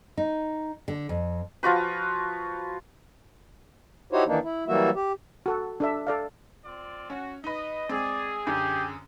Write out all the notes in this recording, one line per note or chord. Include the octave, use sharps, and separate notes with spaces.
D#4
D3
F2
F3 F4 F#4 B4
D#4 E4 F#4 G4 C5 C#5
D#3 E3 A#3 D4 D#4
E4
E3 F#3 G3 A#3 F#4 E5
G4
F#4 A4
D4 A4 E5
A4 D5 F5
C4 F4 D5
C#4 F#4
D#4 B4 D#5
G#3 C4 G#4 D5
F#2 D3 G4